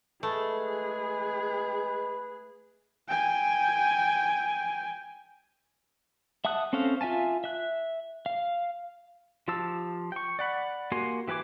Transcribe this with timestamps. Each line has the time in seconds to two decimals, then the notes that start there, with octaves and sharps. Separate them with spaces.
0.23 G#3 A3 G#4 B4
3.09 G5 G#5
6.45 E5 F#5 A5 D#6 F#6
6.73 C4 C#4 A4 C5 F5
7.01 F4 E5 G#5 A5
7.44 E5 F#6
8.26 F5
9.48 F3 F4 G4 A5 E6
10.12 G5 C#6
10.39 D5 F#5 B5
10.92 A#3 F#4 G4 G#5 C6
11.28 E3 G4 B4 G#5 D6